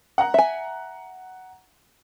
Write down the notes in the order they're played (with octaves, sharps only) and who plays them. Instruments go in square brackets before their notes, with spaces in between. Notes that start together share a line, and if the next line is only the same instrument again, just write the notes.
[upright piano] F#5 A#5 F#6
[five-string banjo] E5 G#5